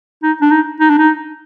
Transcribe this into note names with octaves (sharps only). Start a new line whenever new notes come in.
D#4
D4
D#4
D#4
D4
D#4